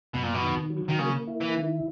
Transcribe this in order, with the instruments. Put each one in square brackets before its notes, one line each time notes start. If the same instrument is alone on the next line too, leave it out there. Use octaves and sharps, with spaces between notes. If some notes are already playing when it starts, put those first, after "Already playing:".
[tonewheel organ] F#2 [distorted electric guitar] B2
[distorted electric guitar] A#2
B2
[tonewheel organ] D#3
F#3
[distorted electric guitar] D#3
[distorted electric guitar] C#3 [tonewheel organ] A#3
[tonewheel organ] E4
[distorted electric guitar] E3
[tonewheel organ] D#3